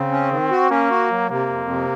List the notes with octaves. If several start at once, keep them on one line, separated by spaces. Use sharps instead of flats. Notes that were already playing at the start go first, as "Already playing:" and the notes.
Already playing: C#3 C4
C#4
D#3
F#4
A#3 C#4
F#4
F#3
C3 A#3
F2
C3